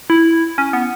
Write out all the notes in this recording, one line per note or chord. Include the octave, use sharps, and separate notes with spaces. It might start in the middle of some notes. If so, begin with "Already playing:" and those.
E4
C#4
B3